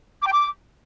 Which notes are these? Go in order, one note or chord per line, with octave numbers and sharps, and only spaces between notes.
D6
G5
D6